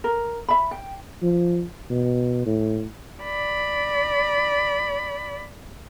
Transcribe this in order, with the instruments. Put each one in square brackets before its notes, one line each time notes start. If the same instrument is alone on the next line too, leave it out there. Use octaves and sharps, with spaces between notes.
[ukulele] A#4
E5 B5
G5
[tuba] F3
B2
A2
[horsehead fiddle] D5 B5